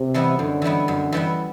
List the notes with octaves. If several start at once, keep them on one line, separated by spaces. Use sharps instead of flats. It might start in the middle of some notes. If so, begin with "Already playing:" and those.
Already playing: C3
E3 G3 B3 E4
F#2 D3
E3 G3 B3 E4
F#2
E3 G3 B3 E4